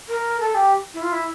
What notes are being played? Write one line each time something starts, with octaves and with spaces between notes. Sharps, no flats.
A#4
A4
G4
E4
F4
E4